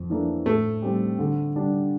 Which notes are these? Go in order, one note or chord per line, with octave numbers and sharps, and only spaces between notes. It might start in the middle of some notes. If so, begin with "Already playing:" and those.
Already playing: F2
E3 A#3 D4 A4
A2 A3
G3 C4 G4
D3
G3 D4